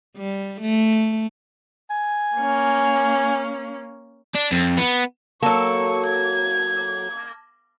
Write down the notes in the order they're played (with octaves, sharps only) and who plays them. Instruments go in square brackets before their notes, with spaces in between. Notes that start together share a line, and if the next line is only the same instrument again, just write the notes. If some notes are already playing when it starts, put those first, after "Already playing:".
[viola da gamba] G3
A3
[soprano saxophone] G#5
[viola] A#3 C#4
[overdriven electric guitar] D4
F2
B3
[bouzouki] F#3 A4 [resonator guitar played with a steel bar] A#3 [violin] C#6
[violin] G#6